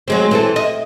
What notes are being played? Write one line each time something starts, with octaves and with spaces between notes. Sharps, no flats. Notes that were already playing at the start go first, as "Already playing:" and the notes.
F#3 G#3 C4
E3 C4 A4
D#5